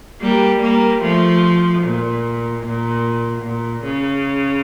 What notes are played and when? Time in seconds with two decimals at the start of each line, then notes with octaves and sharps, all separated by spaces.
0.21 G3 A#3
0.62 G3 A#3
1.02 F3 A3
1.83 A#2
2.63 A#2
3.43 A#2
3.84 C#3